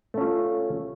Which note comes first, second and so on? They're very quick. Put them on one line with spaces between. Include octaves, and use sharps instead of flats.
A3 C#4 F4